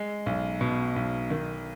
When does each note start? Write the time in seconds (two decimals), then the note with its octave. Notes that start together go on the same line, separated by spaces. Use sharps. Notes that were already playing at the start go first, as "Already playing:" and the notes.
Already playing: G#3
0.26 B1
0.61 B2
0.96 B1
1.30 D#3